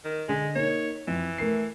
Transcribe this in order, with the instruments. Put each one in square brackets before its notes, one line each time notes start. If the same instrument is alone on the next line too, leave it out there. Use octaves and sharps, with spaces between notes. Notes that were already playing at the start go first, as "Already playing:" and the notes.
[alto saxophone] D#3
[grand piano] D3 D#5 B6 [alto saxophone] G#3
[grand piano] A#3 D#4 [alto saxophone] C#5
[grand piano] F2 [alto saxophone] E3
[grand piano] A3 A#4 C7